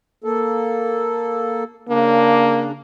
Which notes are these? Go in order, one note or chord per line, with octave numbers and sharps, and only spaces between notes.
A#3 A4
C#3 A#3 D4